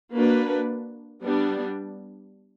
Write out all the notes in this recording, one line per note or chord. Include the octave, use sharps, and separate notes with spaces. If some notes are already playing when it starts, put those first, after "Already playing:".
A#3 D4 F#4 B4
G3 B3 D4